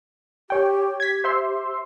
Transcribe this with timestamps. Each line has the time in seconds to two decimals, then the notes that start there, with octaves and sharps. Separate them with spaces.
0.50 G4 C#5 G5
1.00 G4 G#6 B6
1.24 C5 E5 C6